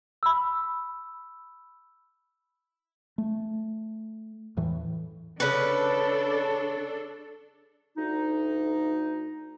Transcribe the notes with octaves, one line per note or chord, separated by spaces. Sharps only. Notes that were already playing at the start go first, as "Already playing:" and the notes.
B5 E6
A3
E2 A2 E3
C#3 D4 A4 B4
D2 D#4